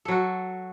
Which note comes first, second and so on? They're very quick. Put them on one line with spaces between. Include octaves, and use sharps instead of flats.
A4 F#3 F#4